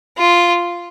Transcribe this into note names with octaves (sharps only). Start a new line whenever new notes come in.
F4